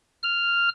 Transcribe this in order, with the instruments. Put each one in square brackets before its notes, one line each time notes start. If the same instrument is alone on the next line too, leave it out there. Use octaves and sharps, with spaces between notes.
[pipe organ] F6